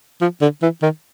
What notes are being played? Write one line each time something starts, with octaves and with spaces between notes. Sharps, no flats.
F3
D3
E3
D#3